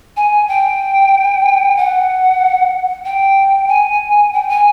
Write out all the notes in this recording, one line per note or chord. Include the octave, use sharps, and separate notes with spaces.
G#5
G5
F#5
G5
G#5
G5
G#5